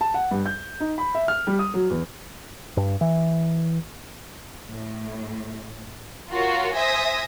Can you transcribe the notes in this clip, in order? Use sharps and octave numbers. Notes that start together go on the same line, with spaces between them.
A5
F#5
G2
G6
D#4
B5
E5
F6
G3
D#6
F#3
E2
G2
E3
A2
F4 F#4 A#4 C#5
C5 E5 G#5 D#6 A#6